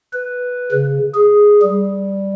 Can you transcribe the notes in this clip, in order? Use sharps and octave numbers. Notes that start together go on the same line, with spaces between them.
B4
C#3
G#4
G3